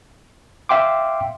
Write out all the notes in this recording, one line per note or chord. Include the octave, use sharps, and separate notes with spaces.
E5 F5 G5 C6 D6